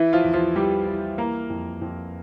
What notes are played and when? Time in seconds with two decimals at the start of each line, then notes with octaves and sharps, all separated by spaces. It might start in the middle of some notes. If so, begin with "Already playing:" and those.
Already playing: E3 E4
0.13 F3 F4
0.24 E2
0.34 F3 F4
0.55 E2 G3 G4
0.87 E3
1.18 E3 A#3 A#4
1.50 F2
1.82 F2